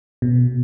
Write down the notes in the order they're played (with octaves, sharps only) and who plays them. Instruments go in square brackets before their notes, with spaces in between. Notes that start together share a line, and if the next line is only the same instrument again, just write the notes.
[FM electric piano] B2